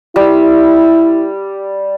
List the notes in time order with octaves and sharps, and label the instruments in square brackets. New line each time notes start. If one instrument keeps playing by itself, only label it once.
[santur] G3 [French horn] E4